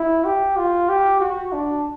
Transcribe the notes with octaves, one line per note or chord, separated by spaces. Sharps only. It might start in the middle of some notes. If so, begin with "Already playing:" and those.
Already playing: E4
G4
F4
G4
F#4
D4